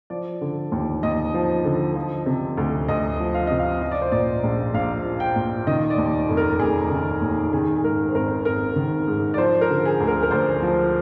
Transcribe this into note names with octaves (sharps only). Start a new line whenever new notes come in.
F3 D5
D3
D#2
D#2 D#5
F3
D3
F3
C3
D2
D2 D#5
F3
F5
C3 D#5
F5
F3 D#5
D5
C5
A#2 D5
A#1
A#1 F5
F3
G5
A#2
D#3 D#5
D5
D#2
F1
A#4
F1 G#4
D#3
D#2
D#3 G#4
G#4
G#2 A#4
C5
G#1 A#4
G#1 A#4
D#3
G#2
D5
F3 C5
A#4
D3
G#4
D2
A#4
A#4
D2 C5
F3